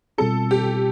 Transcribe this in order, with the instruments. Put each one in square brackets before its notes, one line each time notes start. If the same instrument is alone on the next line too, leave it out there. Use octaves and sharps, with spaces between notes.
[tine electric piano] B2 G3 C4 F4 [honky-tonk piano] A4
[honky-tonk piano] G4